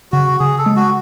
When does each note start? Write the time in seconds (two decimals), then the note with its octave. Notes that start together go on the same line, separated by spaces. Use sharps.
0.12 C#3 F#4
0.39 C#3 G#4
0.58 A4
0.66 G#3
0.76 F#4